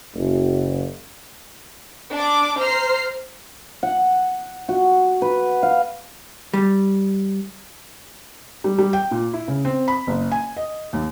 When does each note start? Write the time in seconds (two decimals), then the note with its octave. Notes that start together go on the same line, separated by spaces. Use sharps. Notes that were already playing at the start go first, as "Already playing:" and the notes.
0.14 F#1
2.13 D4 D6
2.59 C5 A#5 F6 C7
3.83 F#5
4.69 F#4
5.22 B4
5.63 F5
6.53 G3
8.64 G3
8.78 G3
8.93 G5
9.11 A#2
9.33 E4
9.48 C#3
9.65 C4
9.88 B5
10.07 F#1
10.32 G#5
10.56 D#5
10.93 D#2